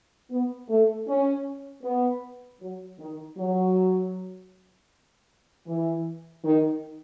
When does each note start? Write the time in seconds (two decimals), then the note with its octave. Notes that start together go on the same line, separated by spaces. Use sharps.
0.30 B3
0.69 A3
1.08 C#4
1.83 B3
2.61 F#3
2.99 D#3
3.37 F#3
5.67 E3
6.44 D#3